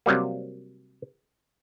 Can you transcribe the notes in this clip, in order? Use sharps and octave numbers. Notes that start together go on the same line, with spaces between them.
C3 F#3 G3 A#3